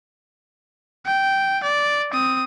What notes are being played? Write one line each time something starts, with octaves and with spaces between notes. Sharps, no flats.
G5
D5
C4 D#6